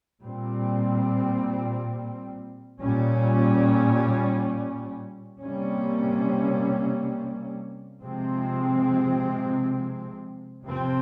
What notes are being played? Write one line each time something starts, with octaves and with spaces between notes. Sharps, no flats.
A#2 G3 C4
A#2 G3 C#4
C3 G3 A#3 C#4
C3 F3 G#3 C4
C3 F3 C4